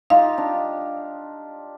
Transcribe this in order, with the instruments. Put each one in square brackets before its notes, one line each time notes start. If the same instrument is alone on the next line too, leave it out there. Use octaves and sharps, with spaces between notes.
[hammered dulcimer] D#4 F4 G4 [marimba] F5
[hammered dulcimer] D4